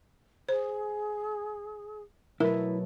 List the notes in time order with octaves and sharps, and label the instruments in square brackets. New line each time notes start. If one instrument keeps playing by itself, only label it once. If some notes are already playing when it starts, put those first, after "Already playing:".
[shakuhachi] G#4 [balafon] C5
[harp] B2 F#3 A3 [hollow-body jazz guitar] E4 B4 [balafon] A#4